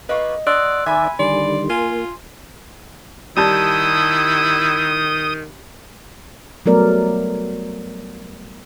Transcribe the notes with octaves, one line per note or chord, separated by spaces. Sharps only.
A#3 F4 B4 D#5 C#6
D5 D#5 F#5 C6 E6 F#6
D#3 D5 E5 G#5 B5
D3 D#3 G3 D5 C6
A#3 F4 G#5
D#3 G3 E4 A5 D#6 G6
F#3 G3 A3 B3 A#4 D5